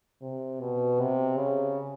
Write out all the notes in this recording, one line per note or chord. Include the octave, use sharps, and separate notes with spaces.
C3
B2
C3
C#3